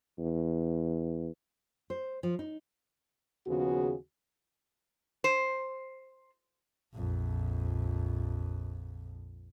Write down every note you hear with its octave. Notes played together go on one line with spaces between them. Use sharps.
E2
C5
F3
D#4
D#2 C#3 F3 B3 F#4 G#4
C5
A#1 F2